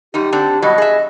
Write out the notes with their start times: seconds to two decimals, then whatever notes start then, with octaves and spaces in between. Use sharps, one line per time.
0.14 F#2 G3 D#4 G4
0.32 D3 C4 D4
0.62 B2 F#3 G3 D#5
0.78 G#4 E5